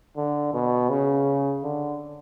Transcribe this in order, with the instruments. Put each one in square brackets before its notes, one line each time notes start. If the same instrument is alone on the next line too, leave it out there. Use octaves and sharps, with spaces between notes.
[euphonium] D3
B2
C#3
D3